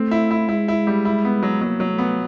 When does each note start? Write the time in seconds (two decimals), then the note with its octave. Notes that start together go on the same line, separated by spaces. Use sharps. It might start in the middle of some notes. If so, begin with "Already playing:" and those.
Already playing: A3 C4
0.11 E4
0.31 E4
0.49 G#3 E4
0.68 E4
0.87 G3
1.05 E4
1.25 B3
1.43 F#3
1.61 F#3 A#3
1.80 F#3
1.89 A3
1.98 B3